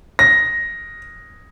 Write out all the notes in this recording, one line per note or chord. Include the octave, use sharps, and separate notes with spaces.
A#6